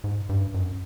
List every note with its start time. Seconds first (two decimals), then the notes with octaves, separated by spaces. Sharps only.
0.04 G#2
0.29 G2
0.54 F#2